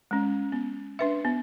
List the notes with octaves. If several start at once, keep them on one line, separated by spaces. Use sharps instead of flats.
G#3 C#4
B3
D4 B4 E5
B3